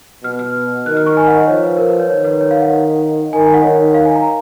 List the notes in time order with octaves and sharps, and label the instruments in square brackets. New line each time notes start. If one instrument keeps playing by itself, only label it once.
[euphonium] B2 [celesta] F6
[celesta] F6
[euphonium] D#3 [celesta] F#6
[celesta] F6
C#6
G#5
F#5
D#5
[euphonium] F3 [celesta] C#5
[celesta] B4
A#4
B4
C#5
[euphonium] D#3 [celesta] C#5
[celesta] B4
C#5
F5
F#5
[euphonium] D#3 [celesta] G#5
[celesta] G#5
F#5
[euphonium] D#3 [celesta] C#5
[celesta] F5
G#5
A#5